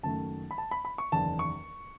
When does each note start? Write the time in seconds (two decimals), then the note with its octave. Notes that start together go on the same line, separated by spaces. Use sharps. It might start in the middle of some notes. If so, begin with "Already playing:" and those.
0.03 F#1 F#2 D#3 F#3 A3 A5
0.51 B5
0.58 A5
0.71 B5
0.85 B5
0.98 C#6
1.12 F#1 E2 D#3 A5
1.39 C#6